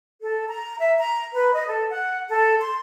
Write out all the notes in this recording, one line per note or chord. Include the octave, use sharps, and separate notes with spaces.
A4
A#5
E5
A#5
B4
D#5
A4
F#5
A4
C6